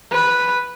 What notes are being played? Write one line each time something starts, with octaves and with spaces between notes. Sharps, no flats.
B4